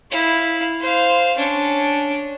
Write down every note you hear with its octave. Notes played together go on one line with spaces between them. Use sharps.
E4 F5
C5 F5
C#4 D4